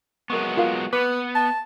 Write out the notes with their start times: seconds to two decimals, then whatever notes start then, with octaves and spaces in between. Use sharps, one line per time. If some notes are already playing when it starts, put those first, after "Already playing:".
0.30 F#3 G#3 B3 A#4 C#6
0.57 F4 A#4 F5
0.93 B3 B4 D6
1.35 A5